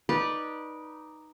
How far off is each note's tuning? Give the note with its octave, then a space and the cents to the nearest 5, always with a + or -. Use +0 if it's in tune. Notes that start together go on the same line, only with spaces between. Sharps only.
D#4 +0 B4 -20 D5 +0